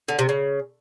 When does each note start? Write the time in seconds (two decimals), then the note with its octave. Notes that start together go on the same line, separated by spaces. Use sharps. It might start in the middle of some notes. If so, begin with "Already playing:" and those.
0.08 D3
0.19 C3
0.29 C#3